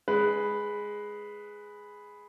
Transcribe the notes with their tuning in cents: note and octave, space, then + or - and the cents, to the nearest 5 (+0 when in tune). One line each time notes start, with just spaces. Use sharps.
G#3 +0 B4 +0